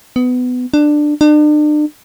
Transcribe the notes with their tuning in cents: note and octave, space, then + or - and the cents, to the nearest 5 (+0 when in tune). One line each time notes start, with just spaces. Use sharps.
B3 +20
D4 +15
D4 +40